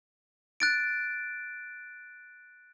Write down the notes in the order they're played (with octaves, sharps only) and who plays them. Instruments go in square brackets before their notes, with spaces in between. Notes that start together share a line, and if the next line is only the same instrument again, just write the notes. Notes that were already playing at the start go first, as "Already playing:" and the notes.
[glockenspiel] F#6 A6 D7